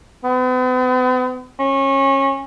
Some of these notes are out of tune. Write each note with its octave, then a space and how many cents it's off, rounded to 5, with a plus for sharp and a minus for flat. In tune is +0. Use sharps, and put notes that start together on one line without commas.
B3 +45
C#4 -25